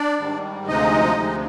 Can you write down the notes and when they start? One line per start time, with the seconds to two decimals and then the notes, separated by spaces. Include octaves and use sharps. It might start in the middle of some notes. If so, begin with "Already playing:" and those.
Already playing: D4 D5
0.19 G#2 D#3 G3
0.68 D2 C3 F3 G#3 D#4 D#5
1.16 D2 C3 F3 G#3